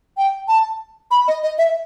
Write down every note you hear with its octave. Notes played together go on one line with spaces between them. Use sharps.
G5
A5
B5
D#5
D#5
E5